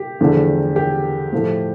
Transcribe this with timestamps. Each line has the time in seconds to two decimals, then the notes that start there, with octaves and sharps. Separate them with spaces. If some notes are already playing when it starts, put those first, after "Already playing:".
Already playing: G4
0.20 E2 D3 F3 A3
0.76 G4
1.32 A2 F3 A3